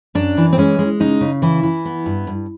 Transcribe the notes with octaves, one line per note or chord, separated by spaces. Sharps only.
F#2 D4
E3
C4
G#3 C#4
G#3
C#3 D#4
C#3
E3 E4
E3
B3
G2
G2